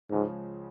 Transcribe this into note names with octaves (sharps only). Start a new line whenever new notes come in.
C#2 G#2 C#3 F3 G#3 C#4